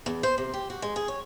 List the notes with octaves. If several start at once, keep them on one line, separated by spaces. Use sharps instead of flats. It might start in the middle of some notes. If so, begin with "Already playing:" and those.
E2
C5
C3
G4
F#4
G#3
G#4
C#5